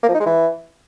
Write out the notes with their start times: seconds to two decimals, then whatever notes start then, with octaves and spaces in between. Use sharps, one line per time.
0.03 A#3
0.08 F3
0.14 D#4
0.20 G#3
0.26 E3